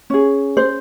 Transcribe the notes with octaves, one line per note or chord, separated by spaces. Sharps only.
C#4 G#4
C5